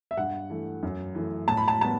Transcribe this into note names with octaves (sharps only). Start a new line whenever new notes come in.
E5
G2 F#5
E3 A3
F#2
E3 A3
A2 A5
B5
A5
G3 B3 A5